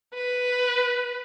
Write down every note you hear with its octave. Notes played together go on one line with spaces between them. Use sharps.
B4